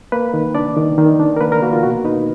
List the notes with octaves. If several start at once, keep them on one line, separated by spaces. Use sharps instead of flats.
A#3 B4
D#3
D4 D5
D#3
D#3
D4
A#4
A#3 B4
A#4
A#3 F#4
F4
B2 F#4
D#4 B4